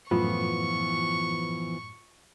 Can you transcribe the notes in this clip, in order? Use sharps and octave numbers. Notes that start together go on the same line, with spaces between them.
F#2 A2 E3 F3 B3 F4 C#6